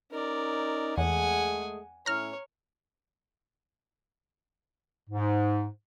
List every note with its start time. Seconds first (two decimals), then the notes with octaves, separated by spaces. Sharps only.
0.11 C#4 D#4 A#4 D5
0.97 E2 G#3 A3 G#4 F#5 G#5
2.06 A2 C#4 E4 C#5 A#5 F6
5.10 G#2